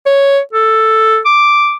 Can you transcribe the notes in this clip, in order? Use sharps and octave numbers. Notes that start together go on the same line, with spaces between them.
C#5
A4
D6